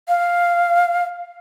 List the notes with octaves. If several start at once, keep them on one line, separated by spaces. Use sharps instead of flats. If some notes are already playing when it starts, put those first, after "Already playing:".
F5